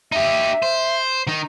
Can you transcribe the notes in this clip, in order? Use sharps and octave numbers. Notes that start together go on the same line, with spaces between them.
D#4 G4 E5
C5
D#3 D#4